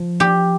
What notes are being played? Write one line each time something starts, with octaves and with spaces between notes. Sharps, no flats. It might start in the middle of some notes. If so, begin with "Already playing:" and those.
Already playing: F3
G4